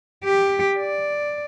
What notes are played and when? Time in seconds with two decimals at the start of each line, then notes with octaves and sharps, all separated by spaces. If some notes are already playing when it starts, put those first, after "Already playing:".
0.25 G4
0.79 D5